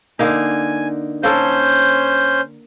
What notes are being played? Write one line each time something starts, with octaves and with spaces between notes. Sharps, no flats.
D3 A#3 D#4 G#5
A#3 C#4 A4 C5 G6